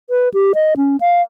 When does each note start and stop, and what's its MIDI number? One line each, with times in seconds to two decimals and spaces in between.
0.10 0.29 71
0.34 0.53 67
0.55 0.74 75
0.77 0.97 61
1.01 1.22 77